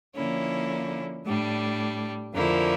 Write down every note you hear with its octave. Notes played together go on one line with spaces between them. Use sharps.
D3 F3 A#3 C#4 E4
A2 G3 D4
F2 D3 F3 A#3 E4